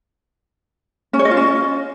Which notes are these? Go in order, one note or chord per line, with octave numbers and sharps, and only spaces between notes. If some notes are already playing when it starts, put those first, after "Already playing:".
C#4
C#5
D#5
F4
C#4